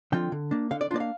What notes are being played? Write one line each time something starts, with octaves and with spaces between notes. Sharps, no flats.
D3 F3 C4 F4 G5
D3
A#3 D4
D3 F5
D5
A#3 D4 F4 D5
F5